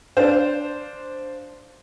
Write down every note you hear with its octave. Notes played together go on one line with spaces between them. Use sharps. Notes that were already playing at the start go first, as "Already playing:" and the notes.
D4 C5 F5